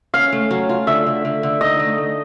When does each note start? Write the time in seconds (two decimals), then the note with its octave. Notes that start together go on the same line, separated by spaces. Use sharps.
0.14 C#4 F5
0.32 A3
0.51 F#3
0.69 F4
0.87 D3 E5
1.06 D3
1.25 D3
1.43 D3
1.61 D#4 D#5
1.80 A3
1.97 A3